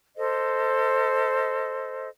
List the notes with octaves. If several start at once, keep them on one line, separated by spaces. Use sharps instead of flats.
A4 C5 D#5